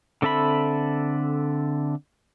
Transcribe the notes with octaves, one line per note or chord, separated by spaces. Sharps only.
D3 C4 A4 E5 B5